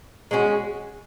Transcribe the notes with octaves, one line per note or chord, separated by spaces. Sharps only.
G#3 C#4 F#4